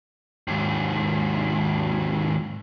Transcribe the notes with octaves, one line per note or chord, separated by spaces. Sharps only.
D#2 G#2